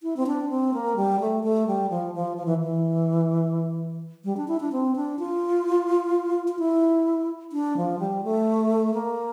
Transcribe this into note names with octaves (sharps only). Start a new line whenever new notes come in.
E4
C4
D4
C4
A#3
G3
A3
A3
G3
F3
F3
F3
E3
E3
G3
D4
E4
D4
C4
D4
F4
F4
E4
D4
F3
G3
A3
A#3